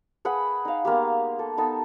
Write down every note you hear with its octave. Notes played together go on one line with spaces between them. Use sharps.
G#4 B4 F#5 B5
D#4 F5
G#3 A#3 B3 G4
A4
B3 D#4 A4